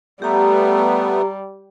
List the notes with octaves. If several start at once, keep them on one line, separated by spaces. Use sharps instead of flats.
G3 A3 B3 G4 A#5